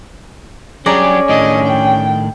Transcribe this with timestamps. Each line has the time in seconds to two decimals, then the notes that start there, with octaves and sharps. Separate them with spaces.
0.86 F#3 C#4 D4 G4 G#4 D5 A#5
1.29 A2 D#3 D4 D#5
1.67 G5